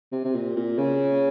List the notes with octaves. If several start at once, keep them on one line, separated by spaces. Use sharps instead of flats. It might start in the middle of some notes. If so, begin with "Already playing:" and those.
C3
C3
A#2
A#2
C#3